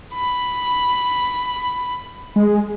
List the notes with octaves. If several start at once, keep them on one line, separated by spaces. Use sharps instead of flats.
B5
G#3